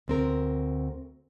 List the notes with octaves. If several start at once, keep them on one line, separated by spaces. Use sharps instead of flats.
D2 C4 A#4